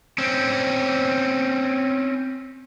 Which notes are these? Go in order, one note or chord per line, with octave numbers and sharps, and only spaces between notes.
C4 C#4